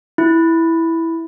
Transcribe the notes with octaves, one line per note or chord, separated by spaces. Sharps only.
E4